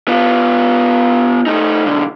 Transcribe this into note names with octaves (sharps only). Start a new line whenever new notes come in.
B3 F4
A3 D#4
B1 D3